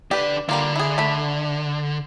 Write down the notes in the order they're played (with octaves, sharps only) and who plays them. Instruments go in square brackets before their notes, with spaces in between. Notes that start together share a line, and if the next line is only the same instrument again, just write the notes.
[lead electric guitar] D3 D5 [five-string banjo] G4 B4
[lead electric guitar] D3 [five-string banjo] G3 A#3 F4
[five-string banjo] E4 G#4
A3 B5